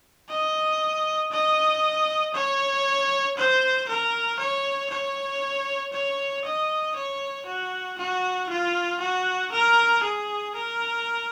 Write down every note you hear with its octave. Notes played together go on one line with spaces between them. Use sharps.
D#5
D#5
C#5
C5
A#4
C#5
C#5
C#5
D#5
C#5
F#4
F#4
F4
F#4
A#4
G#4
A#4